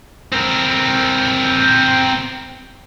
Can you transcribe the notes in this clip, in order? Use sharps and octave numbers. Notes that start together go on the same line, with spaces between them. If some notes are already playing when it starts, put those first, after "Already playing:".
C4 A#4